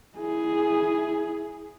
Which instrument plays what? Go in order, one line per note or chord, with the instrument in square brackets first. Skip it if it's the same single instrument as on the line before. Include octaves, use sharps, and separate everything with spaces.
[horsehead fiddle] E4 G#4